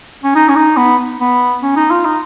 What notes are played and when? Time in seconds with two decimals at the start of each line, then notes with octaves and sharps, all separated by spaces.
0.24 C#4
0.35 D#4
0.49 C#4
0.56 D#4
0.77 B3
1.20 B3
1.63 C#4
1.76 D#4
1.91 F4
2.05 D#4